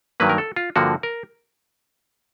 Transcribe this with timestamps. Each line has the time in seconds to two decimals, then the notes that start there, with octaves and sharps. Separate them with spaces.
0.20 G2 D#3 F#3 A#3 B4
0.29 A#4
0.38 A4
0.56 F4
0.76 G2 D3 F3 A#3 F#4
1.03 A#4